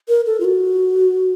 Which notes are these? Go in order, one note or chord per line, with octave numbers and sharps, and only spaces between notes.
A#4
A4
F4
F#4